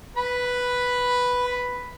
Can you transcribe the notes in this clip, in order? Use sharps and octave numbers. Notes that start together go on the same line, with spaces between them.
B4 B5